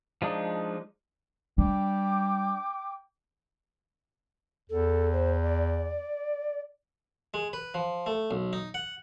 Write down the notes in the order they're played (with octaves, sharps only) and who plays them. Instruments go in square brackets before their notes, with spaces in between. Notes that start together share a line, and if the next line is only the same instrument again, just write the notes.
[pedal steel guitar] F3 G#3 D4 D#4
[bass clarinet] G3 [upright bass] D4 [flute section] G5 D6
[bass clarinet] E2 [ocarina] A4
[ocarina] C5
D5
[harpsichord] G#3
B4
F3
A3
B1
D#4
F#5